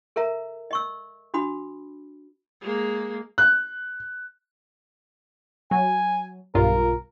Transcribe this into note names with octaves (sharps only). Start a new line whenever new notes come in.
A4 A#4 E5 A#5
D#5 C#6 E6
D4 F#4 B5 D#6
G#3 A#3
F#6
F#3 G#5
B1 G2 F4 A#4